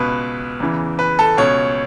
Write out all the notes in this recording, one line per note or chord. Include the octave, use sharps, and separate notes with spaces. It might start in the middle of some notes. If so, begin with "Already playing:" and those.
Already playing: C#2 B2 B4
E2 C#3 E3
B4
A4
C#2 B2 C#5